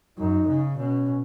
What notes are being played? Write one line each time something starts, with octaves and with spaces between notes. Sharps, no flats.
F#2 D#4
C#3
B2 C#4